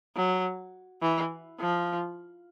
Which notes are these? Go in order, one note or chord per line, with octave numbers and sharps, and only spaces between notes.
F#3
E3
F3